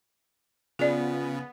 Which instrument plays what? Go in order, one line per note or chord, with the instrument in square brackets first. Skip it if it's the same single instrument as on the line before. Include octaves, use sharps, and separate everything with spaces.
[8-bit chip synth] C#3 [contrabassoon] F3 [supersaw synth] B3 [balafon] G#4 D5